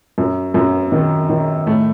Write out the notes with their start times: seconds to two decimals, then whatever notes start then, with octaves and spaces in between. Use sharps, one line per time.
0.18 F#2
0.54 F#2
0.92 D#3
1.29 D#3
1.66 A2 A3